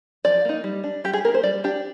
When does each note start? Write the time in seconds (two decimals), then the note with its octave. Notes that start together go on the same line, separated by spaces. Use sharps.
0.25 F3 D5
0.45 A#3 D#4
0.64 G3
0.84 D4
1.04 G3 G4
1.13 G#4
1.24 A#3 A#4
1.28 D#4
1.34 C5
1.43 G3 D5
1.64 D4 G4